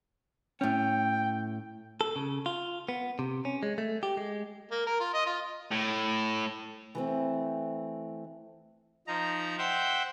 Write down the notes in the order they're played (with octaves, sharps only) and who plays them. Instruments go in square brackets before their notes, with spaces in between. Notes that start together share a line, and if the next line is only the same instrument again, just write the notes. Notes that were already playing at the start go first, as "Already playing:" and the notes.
[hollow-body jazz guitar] A2 C#4 [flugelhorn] G5
[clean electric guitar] A4
C#3
F4
B3
C3
C#4
G#3
A3
G4
G#3
[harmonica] A#3
A#4
F4
D#5
F4
[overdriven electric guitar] A2
[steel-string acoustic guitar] E3 A3 C4
[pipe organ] F3 D#4 A#5
C5 E5 F#5 G5 G6